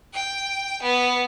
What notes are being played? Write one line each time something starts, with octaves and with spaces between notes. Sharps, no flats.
G5
B3